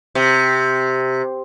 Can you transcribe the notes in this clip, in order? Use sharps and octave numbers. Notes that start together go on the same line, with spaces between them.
C3